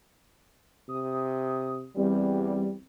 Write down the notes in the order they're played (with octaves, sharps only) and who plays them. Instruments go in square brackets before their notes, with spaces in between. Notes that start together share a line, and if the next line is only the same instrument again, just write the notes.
[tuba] C3 [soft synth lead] D#6
[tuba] E2 [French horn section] G3 [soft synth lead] C4